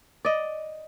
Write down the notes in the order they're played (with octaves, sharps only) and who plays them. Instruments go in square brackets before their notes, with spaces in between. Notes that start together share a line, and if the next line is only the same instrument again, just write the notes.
[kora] D5 D#5